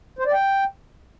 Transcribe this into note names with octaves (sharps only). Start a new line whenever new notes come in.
C5
D5
G5